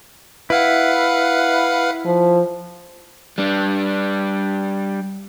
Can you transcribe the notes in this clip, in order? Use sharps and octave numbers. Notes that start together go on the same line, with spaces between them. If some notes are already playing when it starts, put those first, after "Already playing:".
E4 B4 F5 F#5
F3
G3 D4